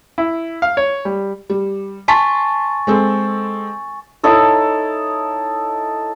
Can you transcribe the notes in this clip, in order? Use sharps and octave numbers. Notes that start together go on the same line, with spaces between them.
E4
F5
C#5
G3
G3
G#5 A5 C6 C#6 A6 B6
G#3 C4 A4
D#4 E4 A4 C#5